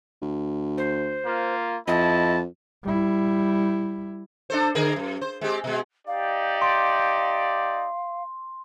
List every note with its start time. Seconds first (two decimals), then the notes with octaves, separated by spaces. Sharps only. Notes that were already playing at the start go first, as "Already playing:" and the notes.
0.22 D2
0.78 C5
1.26 A#3 F4
1.88 F2 E4 D#5 A5
2.83 G3 E4
4.50 D4 A4 C5
4.75 D3 G#4 A#4
4.96 F#2
5.21 C5
5.41 G#3 C4 G4
5.64 B2 G#3
6.07 D#4 G4 D5 F5
6.62 C6